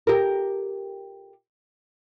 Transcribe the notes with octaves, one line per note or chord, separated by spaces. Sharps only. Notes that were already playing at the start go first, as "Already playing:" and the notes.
G4 A#4